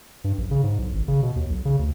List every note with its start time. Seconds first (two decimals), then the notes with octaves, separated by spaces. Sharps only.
0.24 G2
0.38 A#1
0.51 C#3
0.63 G#2
0.79 B1
0.94 G#1
1.08 C#3
1.23 B2
1.36 D#2
1.50 B1
1.65 C#3
1.79 D2